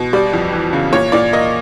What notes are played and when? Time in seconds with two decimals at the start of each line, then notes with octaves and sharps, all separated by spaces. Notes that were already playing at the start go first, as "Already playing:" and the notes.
Already playing: B2
0.13 G3 D5
0.33 F2
0.52 E3
0.73 C#3
0.93 A#2 C#5
1.12 A#2 D5
1.33 A#3 D#5